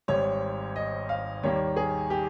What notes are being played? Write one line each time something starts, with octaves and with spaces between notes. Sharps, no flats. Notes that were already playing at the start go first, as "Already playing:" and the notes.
G#1 G#2 G3 C#5
D#5
F5
D#2 D#3 G3 A#3 C#5
G#4
G4